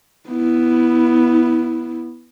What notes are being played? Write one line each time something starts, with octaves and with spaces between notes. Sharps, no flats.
B3 E4